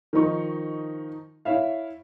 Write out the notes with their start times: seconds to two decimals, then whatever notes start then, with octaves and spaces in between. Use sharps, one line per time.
0.13 D#3 F3 D#4 C#6
1.45 E4 C#5 E5 F5